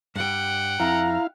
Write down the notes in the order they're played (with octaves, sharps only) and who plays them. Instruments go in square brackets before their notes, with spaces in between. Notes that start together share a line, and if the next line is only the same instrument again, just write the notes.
[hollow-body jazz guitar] G2 G3 [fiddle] F#5 G5
[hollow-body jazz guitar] F2 [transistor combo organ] E4 F5 [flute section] A#5